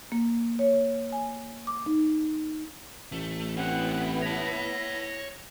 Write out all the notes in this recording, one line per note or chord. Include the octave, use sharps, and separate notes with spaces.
A#3
C#5
G#5
D6
D#4
A1 A3
B3 C4 E4 C#5 F#5
C#5 A5 A#6